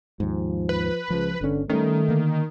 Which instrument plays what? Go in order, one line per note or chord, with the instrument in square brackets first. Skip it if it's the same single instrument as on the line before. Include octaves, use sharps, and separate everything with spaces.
[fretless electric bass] D#2 G#2 [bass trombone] F3
[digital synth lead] B4
[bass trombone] C#2 [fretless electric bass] F3
[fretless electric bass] G1 C#4 [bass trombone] D3
[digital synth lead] D#3 [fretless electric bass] G3 C#4 [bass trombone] A3
[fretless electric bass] D3 A#3